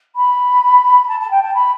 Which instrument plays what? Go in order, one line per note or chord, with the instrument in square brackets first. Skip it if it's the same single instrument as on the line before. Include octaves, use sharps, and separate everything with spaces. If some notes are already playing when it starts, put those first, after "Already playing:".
[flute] B5
A5
A5
G5
A5
B5